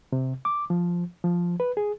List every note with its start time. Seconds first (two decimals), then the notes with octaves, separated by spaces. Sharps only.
0.12 C3
0.45 D6
0.70 F3
1.24 F3
1.60 B4
1.77 G#4